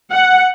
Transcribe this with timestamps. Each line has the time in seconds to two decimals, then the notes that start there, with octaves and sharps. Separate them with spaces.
0.11 F#5